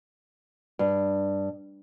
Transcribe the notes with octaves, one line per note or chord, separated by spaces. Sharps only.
G2